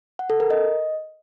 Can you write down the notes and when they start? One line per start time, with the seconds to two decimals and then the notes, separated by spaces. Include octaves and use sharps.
0.19 F#5
0.30 A4
0.40 A#4
0.50 D#5